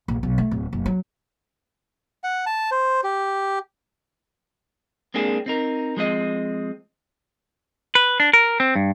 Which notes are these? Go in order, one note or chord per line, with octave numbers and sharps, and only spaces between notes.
A#1
B1
A3
D1
F#1
F#3
F#5
A5
C5
G4
G#3 A#3 C4 D4 G#4
C4 D#4 A#4
F3 G#3 C4 D#5
B4
D4
A#4
C4
G2